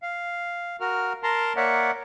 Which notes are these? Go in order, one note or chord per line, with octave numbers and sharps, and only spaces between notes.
F5
F#4 A#4 F6
A#4 A5 A#5 C6
A#3 A#4 C#5 D5 E5 F#5